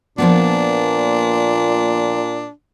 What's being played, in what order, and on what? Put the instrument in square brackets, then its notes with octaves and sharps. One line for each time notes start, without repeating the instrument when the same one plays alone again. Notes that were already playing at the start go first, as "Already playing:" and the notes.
[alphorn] A#2 [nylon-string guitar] F3 A#3 B3 [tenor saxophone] D4